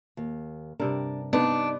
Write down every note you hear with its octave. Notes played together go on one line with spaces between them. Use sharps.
D#2
G2 C3 D4 A#4
B3 C4 D4 D#4